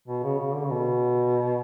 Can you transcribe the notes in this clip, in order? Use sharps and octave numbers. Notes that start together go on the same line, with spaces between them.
B2
C#3
C#3
D3
C#3
B2